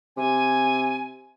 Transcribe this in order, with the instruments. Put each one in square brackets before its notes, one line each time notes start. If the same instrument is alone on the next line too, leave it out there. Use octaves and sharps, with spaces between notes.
[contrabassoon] C3 [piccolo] G#5